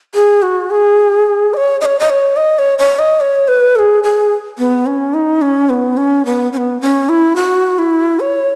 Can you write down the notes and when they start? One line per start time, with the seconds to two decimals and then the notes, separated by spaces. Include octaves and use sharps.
0.15 G#4
0.42 F#4
0.70 G#4
1.54 D#5
1.57 C#5
1.81 D#5
1.86 C#5
2.00 D#5
2.10 C#5
2.37 D#5
2.59 C#5
2.79 C#5
2.99 D#5
3.20 C#5
3.48 B4
3.76 A4
3.79 G#4
4.04 G#4
4.58 B3
4.86 C#4
5.14 D#4
5.42 C#4
5.69 B3
5.97 C#4
6.26 B3
6.53 C#4
6.57 B3
6.81 C#4
7.09 E4
7.36 F#4
7.79 E4
8.20 C#5